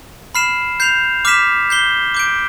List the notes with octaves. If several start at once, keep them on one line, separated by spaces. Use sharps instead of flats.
B5 F6 C7 E7
G6 C7 F7
D6 F6 B6 E7
G6 C7 G7
D6 G6 D7